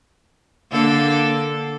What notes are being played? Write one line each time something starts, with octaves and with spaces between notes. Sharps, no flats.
D3 A#3 A4